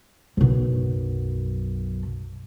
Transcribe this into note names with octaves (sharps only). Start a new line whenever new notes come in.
B1 F#2